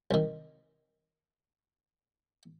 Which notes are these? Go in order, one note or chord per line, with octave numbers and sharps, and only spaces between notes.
C2 D#3